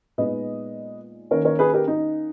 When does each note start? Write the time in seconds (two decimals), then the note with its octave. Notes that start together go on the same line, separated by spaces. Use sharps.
0.18 A#2 G#3 B3 D#4 B4 D#5
1.31 D#3 A#3 C#4 A#4 C#5
1.45 A#4 C#5
1.59 G#4 B4
1.74 G4 A#4
1.88 D#4